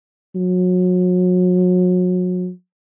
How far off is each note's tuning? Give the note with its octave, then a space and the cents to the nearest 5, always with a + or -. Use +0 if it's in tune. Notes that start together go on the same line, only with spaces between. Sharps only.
F#3 -30